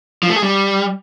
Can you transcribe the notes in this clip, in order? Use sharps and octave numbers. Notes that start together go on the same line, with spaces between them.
F3
A3
G#4
G3